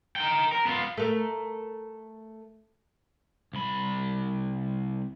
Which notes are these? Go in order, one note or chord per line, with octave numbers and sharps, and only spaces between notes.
A#4 G5
A#4
B3 F4
A3 A#4
C2 B5